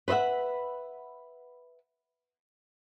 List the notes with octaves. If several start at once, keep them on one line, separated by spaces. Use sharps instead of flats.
B4 C5 D#5 E5 F#5